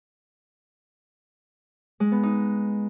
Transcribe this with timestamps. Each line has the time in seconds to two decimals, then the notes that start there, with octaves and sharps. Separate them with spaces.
2.00 G#3
2.12 B3
2.23 D#4